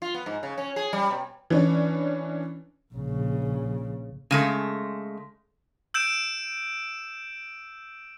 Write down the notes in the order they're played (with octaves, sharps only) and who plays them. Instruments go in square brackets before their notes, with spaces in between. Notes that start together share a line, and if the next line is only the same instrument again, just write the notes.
[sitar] F4
B3
G#2
C#3
C#4
G#4
G3
B2
[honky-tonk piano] E3 C#4 D4
[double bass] A#1 C#3
[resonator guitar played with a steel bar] C#3 G#3 A3
[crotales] E6 G6 D7 E7